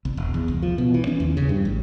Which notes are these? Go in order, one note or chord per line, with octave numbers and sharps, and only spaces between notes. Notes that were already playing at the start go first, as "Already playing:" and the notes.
C2
E1
E2
C2
F3
B2
E3
C#4
D#2
C#3
G2
A1